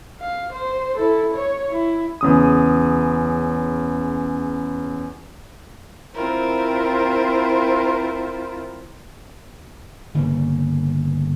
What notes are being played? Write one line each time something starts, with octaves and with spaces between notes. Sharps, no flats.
F5
C5
E4 A4
C#5
E4
E2 C#3 D#6
C4 E4 F4 A#4 C5
G1 C#3 A#3